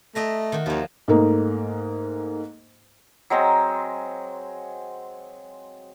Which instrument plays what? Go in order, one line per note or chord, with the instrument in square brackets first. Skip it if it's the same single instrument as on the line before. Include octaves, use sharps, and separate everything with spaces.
[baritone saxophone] A3 [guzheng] D#5 E5 A#5
[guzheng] D#3 F#4
[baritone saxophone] D#2 [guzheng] F3 F#3
[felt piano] G#2 A3 A#3 D#4
[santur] F#3 G#3 C4